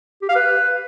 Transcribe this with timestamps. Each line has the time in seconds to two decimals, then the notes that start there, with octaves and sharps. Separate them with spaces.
0.22 G4
0.29 F5
0.36 B4